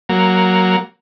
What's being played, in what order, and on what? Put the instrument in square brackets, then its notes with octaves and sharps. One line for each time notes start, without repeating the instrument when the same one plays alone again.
[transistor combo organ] F#3 A#3